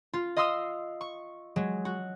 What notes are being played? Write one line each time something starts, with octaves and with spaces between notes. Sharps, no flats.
F4
D#5 F5 C6 D#6 E6
C#6
F#3 G#3
F#4